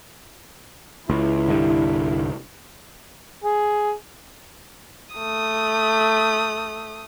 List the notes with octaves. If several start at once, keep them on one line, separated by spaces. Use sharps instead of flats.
C#2 E4
C2 G2 D3
G#4
A3 D#6